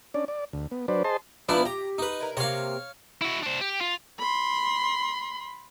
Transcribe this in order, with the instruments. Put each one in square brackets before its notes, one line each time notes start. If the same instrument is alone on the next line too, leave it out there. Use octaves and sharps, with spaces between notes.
[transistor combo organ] C#4 D4 D5
D5
D2
B3
F#3 D4 B4 C5 D5
G#4 C5 D#5 A5 C6
[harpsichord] F3 D4 E4 [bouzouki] B3 B4 A#5
[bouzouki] G4 [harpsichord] A#5
[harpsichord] D#4 B4
[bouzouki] E4 A#4
[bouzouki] C3 A#3 [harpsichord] C#5 F5
[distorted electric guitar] E4 F#4
D4 C5
G4
F4
[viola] B5 C6